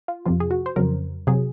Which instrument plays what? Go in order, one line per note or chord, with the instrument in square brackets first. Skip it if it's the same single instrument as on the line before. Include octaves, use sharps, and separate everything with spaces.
[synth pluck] F4
F2 C3 F3 F4
G#4
F#4
C5
F2 C#3 F#3 A#4
C3 F#3 G#4